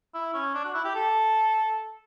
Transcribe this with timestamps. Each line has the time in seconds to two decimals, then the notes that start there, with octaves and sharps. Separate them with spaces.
0.14 E4
0.34 C#4
0.54 D4
0.65 F#4
0.75 E4
0.84 G4
0.95 A4